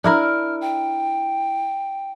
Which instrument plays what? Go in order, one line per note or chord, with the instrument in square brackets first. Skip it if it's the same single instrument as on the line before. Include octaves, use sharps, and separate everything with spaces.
[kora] D4 E4 A#4 [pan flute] F6
[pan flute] G5